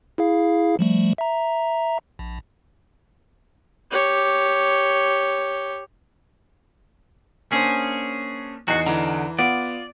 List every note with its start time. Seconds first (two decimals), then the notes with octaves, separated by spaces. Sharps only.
0.18 E4 G#4 F5
0.79 F3 G3 A3
1.18 E5 A#5
2.19 A#1
3.91 G4 C#5
7.52 A#3 C#4 D4 G#4 C5
8.68 E2 D#4 F#4 C7
8.87 D3 E3 A#5
9.39 B3 F4 D5